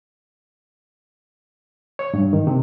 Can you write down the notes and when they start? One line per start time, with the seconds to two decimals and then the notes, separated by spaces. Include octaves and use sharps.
1.99 C#5
2.14 G2
2.33 D#3
2.47 C3